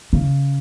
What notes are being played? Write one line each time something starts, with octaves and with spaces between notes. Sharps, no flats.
C#3